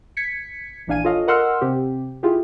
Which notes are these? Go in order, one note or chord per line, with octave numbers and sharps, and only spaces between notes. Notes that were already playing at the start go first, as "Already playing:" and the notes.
G#6 B6 C#7
A#1 E3 D4 F5 G#5 D#7
F4 A4 C#5 D#5 F5
A#4 D#5 F#5 C6 E6 F6
C3 C4 G4
E4 F4 G4 G#4